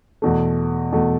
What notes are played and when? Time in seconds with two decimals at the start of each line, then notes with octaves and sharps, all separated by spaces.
0.22 E2 B2 A3
0.92 E2 B2 A3